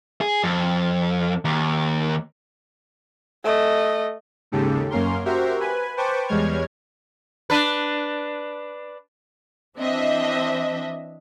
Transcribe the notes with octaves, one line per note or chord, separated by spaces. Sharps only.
G#4
F2
D#2
A3 D#5
D#2 G#2 C#3 G4 A4
F#2 A#3 C#4 A#4 C6
F#4 G4 A#4 C5 E5
B4 G#5
B4 C5 G5 A5 C#6 D6
E2 G3 G#3 C#5 F6 G#6
D4 B4
E3 C4 D4 D#5 E5